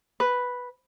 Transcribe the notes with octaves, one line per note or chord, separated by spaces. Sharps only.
B4